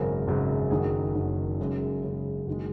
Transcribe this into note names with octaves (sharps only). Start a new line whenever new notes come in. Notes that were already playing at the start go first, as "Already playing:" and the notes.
Already playing: G#1 F#2 C#3 A#4
G#1 F#2 C#3
F#1 F#2 D#3 F#3 G#4
F#1 F#2 D#3 F#3
F#2 C#3 G#3
F#2 C#3 G#3
F#1 D#3 G#3 F#4